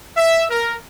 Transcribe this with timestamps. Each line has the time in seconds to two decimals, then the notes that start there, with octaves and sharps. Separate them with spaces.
0.17 E5
0.50 A#4